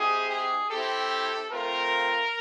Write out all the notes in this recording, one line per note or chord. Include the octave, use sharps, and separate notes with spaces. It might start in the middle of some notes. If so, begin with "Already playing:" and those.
Already playing: G#3 C4 E4 G4 G#4
G#4
C4 E4 G4 A4
A3 C4 F4 A#4